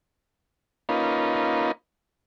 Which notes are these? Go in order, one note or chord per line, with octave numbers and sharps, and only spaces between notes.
A#3 C#4 D#4 F4 B4